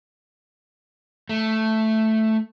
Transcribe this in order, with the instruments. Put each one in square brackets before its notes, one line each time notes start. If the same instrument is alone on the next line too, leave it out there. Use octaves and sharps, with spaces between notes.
[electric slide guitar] A3